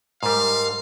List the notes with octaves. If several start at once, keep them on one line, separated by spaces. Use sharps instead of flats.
G#2 G3 A#4 F5